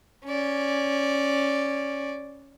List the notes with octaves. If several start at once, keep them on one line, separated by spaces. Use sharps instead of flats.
C#4 D5